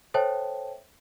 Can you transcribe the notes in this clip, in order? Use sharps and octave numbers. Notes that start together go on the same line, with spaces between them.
A4 C5 C#5 E5 G5 A5